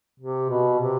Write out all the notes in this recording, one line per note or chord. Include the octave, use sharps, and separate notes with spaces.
C3
B2
C3